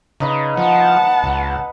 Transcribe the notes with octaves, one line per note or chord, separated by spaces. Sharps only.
C#3 D#4 B4 D#5
F3 F#5 A5
C#2